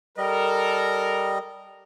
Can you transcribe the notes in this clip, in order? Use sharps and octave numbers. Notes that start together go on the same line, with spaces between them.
G3 A4 A#4 D#5